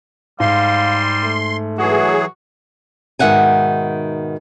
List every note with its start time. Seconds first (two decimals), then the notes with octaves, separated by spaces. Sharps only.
0.40 G#2 G3 F5 C6
1.23 A3
1.78 E3 F#3 F#4 G#4
3.19 G#2 B2 D#3 E5 F#5 G#5